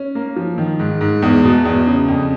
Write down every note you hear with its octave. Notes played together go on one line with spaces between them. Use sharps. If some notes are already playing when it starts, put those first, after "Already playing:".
Already playing: C#4
A#3
F3
D#3
G#2
G#2
E2
B2
E2
C#3
F2